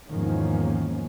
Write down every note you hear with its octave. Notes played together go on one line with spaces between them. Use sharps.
E2 G#2 D#3 F3 A#3 C#4